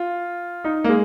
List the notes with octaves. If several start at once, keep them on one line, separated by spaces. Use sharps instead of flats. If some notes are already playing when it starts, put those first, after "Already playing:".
Already playing: F4
D#4
A#3
G#3